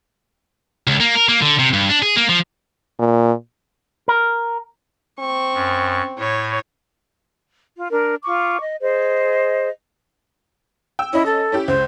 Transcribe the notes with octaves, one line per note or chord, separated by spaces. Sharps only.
C#2
A#3
A#4
A#3
D3
C3
G2
D4
G#4
A#3
F3
A#2
A#4
C4 C#6
F#2
A2 C#5
F4
D4 A#4
F4 C#6 D6
D#5
G#4 C5 D#5
G5 E6
C#4 E4 D#5
A4
C#4 E4 G4
C#2 C5